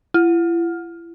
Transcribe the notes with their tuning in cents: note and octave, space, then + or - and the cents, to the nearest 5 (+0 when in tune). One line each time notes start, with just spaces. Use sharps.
E4 +40